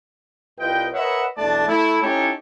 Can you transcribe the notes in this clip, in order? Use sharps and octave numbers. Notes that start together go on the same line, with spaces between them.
C2 F4 B4 D#5 G5
A#4 B4 C#5 D#5 E5 F#5
B1 E2 A3 D4 D5 A5
A3 E4
C#4 D#4 E4 G4 A4 C#5